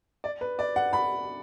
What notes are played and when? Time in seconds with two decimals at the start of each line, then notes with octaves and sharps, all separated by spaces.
0.24 D5
0.41 B4
0.59 D5
0.76 F#5
0.93 B5